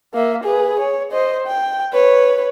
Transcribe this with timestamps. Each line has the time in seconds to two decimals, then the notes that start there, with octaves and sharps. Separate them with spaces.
0.15 A#3 E5
0.44 G#4 B4
0.79 C#5
1.12 C5 D#5
1.47 G5
1.93 B4 C#5